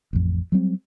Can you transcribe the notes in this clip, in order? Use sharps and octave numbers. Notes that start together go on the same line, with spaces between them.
A1 F2
F#3 G3 C4